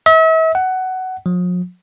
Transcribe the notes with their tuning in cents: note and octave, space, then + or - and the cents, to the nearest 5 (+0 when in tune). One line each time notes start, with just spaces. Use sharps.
E5 -40
F#5 +15
F3 +45